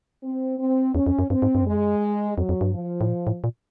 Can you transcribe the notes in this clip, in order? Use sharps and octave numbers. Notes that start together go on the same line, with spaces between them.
C4
C4
E2 C#4
F2
F#2
G2 C4
G#2
G2
F#2
F2 G#3
F#2
F2 F#3
F2
G2
F3
A2
A#2
A2
A#2